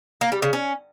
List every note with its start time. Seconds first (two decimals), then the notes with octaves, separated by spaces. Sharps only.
0.21 A#3
0.32 G3
0.42 C#3
0.53 C#4